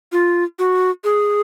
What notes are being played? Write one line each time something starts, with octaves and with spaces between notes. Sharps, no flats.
F4
F#4
G#4